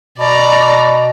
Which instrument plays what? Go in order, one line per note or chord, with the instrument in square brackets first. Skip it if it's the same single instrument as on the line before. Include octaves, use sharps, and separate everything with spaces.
[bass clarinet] B2 [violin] D5 A#5